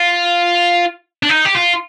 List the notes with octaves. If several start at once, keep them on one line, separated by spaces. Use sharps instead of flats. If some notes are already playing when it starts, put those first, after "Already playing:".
Already playing: F4
D4
D#4
G4
F4